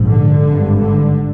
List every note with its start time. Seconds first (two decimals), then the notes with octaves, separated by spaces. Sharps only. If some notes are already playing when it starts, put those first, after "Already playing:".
Already playing: A#1 G#2
0.09 D3
0.45 G#1 G2
0.80 D3